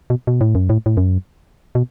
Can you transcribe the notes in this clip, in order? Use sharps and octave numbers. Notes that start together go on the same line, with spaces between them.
B2
B2
A2
F#2
A2
A2
F#2
B2